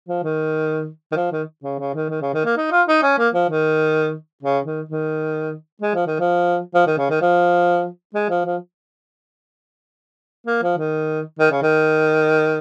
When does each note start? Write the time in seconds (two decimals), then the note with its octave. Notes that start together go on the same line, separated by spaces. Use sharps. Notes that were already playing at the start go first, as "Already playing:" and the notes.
0.09 F3
0.23 D#3
1.12 D#3
1.16 F3
1.32 D#3
1.64 C#3
1.79 C#3
1.94 D#3
2.10 D#3
2.21 C#3
2.34 D#3
2.45 A#3
2.57 D#4
2.72 F4
2.88 D#4
3.03 C#4
3.18 A#3
3.34 F3
3.49 D#3
4.43 C#3
4.65 D#3
4.89 D#3
5.82 G#3
5.95 F3
6.07 D#3
6.19 F3
6.75 F3
6.86 D#3
6.98 C#3
7.10 D#3
7.22 F3
8.14 G#3
8.30 F3
8.45 F3
10.47 A#3
10.63 F3
10.77 D#3
11.39 D#3
11.52 C#3
11.62 D#3